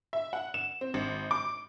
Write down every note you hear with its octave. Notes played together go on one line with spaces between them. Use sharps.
E5
F#5
E7
C4
G#1
D6